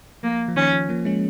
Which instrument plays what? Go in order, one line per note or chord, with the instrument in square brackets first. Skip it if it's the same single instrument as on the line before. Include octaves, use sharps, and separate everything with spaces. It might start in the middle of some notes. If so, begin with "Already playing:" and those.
[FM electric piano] F3 [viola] A#3
[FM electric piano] F3
[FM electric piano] D#3 [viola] C#4
[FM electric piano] F3
F3 A#3
G#3 C#4